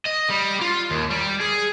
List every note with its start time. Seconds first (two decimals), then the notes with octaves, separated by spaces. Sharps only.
0.06 D#5
0.30 G3
0.61 F4
0.91 D#2
1.10 G3
1.41 G#4